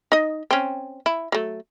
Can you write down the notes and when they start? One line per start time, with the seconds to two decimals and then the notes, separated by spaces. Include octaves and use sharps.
0.12 D#4 D#5
0.51 C4 C#4
1.06 E4
1.32 F#3 A3